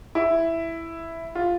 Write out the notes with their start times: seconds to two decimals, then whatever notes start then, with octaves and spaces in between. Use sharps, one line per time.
0.15 E4
1.35 F4